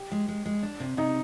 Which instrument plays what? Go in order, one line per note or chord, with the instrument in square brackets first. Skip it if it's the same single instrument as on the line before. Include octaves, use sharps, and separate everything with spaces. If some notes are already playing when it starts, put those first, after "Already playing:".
Already playing: [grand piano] G4
[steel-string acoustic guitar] G#3
G#3
G#3
D4
C3
[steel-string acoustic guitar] C3 [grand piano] D#4